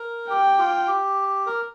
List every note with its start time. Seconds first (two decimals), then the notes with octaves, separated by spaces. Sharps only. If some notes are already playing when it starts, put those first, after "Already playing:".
Already playing: A#4
0.29 G4 G5
0.59 F4
0.88 G4
1.47 A#4